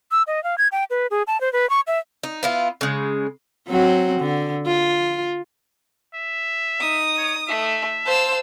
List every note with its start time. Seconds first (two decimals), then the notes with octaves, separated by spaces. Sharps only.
0.12 E6
0.27 D#5
0.44 F5
0.58 G#6
0.72 G5
0.90 B4
1.11 G#4
1.27 A5
1.41 C5
1.53 B4
1.70 C#6
1.87 E5
2.23 D#4
2.43 B3 E4 F4
2.81 C#3 G#3
3.68 F#3 C4 F#4
4.20 D3
4.66 F4
6.14 E5
6.80 D#4 D#6
7.18 C#5
7.48 A3 E5
8.06 C5 F5 A5 E6